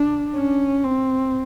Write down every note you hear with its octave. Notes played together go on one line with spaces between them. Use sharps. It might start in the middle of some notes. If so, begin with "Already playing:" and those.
Already playing: D4
C#4
C4